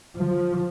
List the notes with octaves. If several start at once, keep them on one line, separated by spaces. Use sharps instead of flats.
F3